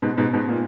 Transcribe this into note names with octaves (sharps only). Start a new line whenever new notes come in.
G#2 B2
G#2 B2
G#2 B2
A#2